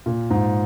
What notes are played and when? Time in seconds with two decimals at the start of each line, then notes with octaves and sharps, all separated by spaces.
0.06 A#2
0.30 G#2